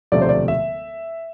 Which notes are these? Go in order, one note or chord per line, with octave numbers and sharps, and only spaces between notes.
E1 D2 C3 F3 A3 D5
C5
D5
E5